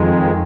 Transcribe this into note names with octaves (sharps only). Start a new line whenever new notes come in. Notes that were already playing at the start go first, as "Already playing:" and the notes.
Already playing: F2 D#3 G#3